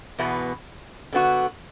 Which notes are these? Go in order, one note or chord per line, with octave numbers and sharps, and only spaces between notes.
E2 B2 B3
D3 B3 F#4